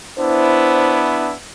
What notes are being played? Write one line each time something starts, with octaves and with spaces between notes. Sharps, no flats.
B3 D4 E4 C5